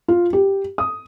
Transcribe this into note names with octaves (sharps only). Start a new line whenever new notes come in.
F4
G4
D#6